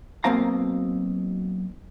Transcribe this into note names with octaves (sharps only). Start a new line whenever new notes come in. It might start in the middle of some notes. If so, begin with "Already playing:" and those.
B1 B2 A#3 C4 F5 A#5